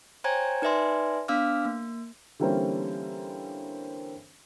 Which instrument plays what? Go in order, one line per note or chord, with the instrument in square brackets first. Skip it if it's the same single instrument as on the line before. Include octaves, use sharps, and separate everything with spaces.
[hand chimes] C5 C#5 G5 G#5 A#5 G#6
D#4 B4 D5 E5 G#5 C6
B3 D4 F5 D6 E6 F6
A#3
[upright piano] D3 E3 G3 A#3 C4 C#4